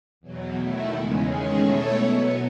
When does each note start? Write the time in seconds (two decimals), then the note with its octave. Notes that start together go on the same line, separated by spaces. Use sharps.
0.21 E2 B2 F#3
0.56 D#3 A3 E4
0.90 E2 C#3 G#3
1.25 D#3 G#3 C#4 G#4
1.60 B2 A3 E4 A4 C#5
1.94 B2 F#3 B3